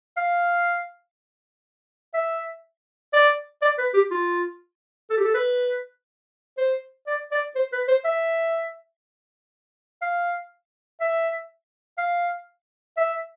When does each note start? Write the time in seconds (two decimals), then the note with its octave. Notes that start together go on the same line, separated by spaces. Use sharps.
0.17 F5
2.14 E5
3.13 D5
3.62 D5
3.78 B4
3.94 G4
4.11 F4
5.10 A4
5.17 G4
5.25 A4
5.35 B4
6.58 C5
7.07 D5
7.31 D5
7.55 C5
7.73 B4
7.88 C5
8.05 E5
10.02 F5
11.00 E5
11.98 F5
12.97 E5